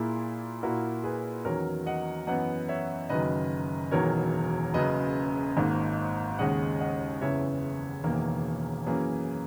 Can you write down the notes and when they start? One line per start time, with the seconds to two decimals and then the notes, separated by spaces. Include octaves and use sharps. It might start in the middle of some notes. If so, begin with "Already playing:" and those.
Already playing: A#2 A#3 E4 G#4
0.63 A#2 A#3 E4 F#4 A#4
1.04 G#4 B4
1.44 E2 D#3 F#3 C#4 A#4 C#5
1.86 D#5 F#5
2.27 F#2 E3 B3 D#5 F#5
2.68 C#5 E5
3.09 F#1 F#2 D#3 B4 D#5
3.91 E1 E2 D#3 F#3 A#4 C#5
4.74 F#1 F#2 C#3 B4 D#5
5.57 G#1 G#2 D#3 A#3
6.39 D#2 C#3 G#3 D#4 D#5 F#5
6.80 D#5 F#5
7.21 F#1 E2 C#3 E3 C#5 E5
8.04 E1 E2 D#3 A#3
8.86 F#2 E3 A#3 C#4 G#4